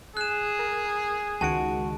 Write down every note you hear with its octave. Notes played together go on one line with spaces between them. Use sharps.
G#4 F#6 E7
A#4
C#2 D#3 G#3 F#4 A5 D7